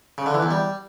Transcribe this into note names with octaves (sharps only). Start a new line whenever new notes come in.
C#3
D3
E3
E2
G3